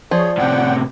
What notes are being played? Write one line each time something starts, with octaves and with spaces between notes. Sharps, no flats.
F3 G#4 C#5 D5
A2 C3 F#5 G5